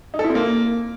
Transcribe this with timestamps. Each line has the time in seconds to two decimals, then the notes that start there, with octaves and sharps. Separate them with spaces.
0.14 D#4
0.19 A4
0.24 E4
0.30 C4
0.35 A#3